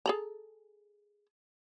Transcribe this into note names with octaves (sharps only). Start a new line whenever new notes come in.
G#4 A4 A#5